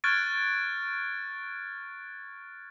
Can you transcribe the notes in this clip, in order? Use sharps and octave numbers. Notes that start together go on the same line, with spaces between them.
C#6 F6 F#6 G#6 A6 D7